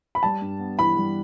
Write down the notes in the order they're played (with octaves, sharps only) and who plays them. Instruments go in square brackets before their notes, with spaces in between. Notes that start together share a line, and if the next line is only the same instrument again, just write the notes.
[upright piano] B5
[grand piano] G3 [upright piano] A5
[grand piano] G2
B3
[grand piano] E3 [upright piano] B5
[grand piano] G3